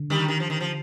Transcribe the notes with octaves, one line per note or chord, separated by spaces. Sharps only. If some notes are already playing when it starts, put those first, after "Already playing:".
Already playing: D3
D#3 G3
D#3
F3
D#3
F3